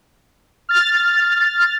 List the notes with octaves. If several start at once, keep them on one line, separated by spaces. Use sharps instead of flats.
F6 A6